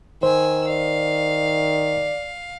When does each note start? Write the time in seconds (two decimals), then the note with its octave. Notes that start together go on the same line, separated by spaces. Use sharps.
0.23 D#3 C5 G#5 E6
0.68 D5 F5